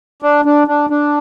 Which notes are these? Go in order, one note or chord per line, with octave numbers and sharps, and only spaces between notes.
D4
D4
D4
D4